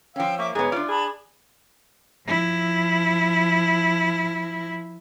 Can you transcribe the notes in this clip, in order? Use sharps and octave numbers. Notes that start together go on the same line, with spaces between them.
F3 C#4 F5 G5 E6
A#3 E5 C#6 D6
G#2 B3 G#4 C#5
D4 F4 D5
G#4 A5 B5
F3 E4